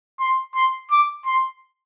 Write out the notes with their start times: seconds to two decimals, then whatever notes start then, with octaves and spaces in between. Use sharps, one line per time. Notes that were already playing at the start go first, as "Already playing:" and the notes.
0.20 C6
0.55 C6
0.91 D6
1.26 C6